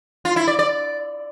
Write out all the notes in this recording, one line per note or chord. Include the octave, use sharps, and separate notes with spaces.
F4
E4
D5
D5